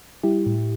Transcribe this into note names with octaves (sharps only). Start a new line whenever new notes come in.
G3 E4 G4
A2